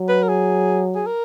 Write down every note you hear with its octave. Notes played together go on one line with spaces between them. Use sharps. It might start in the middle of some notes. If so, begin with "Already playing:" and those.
Already playing: F#3
B4
A#4
G#4
G#4
A#4